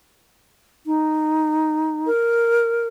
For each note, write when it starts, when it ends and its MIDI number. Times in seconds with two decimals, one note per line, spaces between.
0.86 2.09 63
2.07 2.87 70